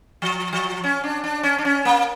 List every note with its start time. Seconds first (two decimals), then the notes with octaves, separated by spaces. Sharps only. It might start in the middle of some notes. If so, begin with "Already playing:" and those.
0.22 F3
0.53 F3
0.84 C#4
1.04 D4
1.24 D4
1.43 C#4
1.58 D4
1.65 C#4
1.85 A#3